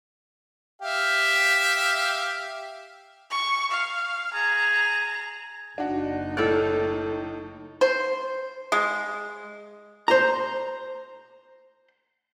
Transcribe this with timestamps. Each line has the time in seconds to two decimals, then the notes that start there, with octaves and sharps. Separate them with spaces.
0.82 G4 E5 F5
3.30 C#6
3.71 F5
4.33 G#4 A#5
5.78 F#1 D4 D#4 F#4
6.37 A2 A4 C#5 D5 F6
7.81 C5
8.72 G#3
10.08 C5 A#5